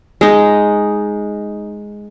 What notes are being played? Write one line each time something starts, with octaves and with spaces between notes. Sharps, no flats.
G#3 D#4